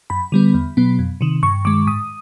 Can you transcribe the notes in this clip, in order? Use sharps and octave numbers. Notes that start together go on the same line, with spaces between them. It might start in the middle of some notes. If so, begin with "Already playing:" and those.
F#2 B5
D3 G3 B3
E2
B2 F#3 B3
F2
C3 D#3
G2 C#6
D#3 G#3 D6
G#2 D#6